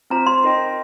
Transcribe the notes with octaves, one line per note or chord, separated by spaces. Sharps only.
C4 F4 C5 A#5
C6
D#4 A#4 D#5 G5